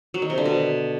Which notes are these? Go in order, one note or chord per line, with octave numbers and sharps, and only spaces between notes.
F#3
D#3
C3
D3
B2